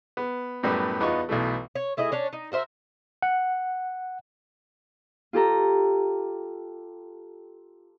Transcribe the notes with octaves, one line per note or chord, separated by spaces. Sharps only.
B3
F#2 A2 G3 B3
E2 B3 D#4 F4 C#6
B1 B2 E3 A3
C#5
A3 E4 G#4 D#5
C#4 D4 C#5
D#4
F#4 A#4 C5 E5
F#5
F4 G4 A4 A#5